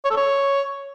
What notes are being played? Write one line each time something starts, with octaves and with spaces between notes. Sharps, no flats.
C#5
A4
C#5